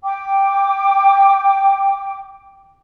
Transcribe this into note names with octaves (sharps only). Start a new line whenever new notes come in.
G5 D6